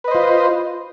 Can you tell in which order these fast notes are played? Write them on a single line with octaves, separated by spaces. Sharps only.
B4 D#5 C5 F4